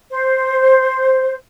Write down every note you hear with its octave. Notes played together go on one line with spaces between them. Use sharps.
C5